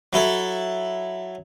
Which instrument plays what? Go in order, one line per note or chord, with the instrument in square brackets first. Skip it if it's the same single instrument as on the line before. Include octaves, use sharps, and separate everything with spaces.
[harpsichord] F#3 E4 A4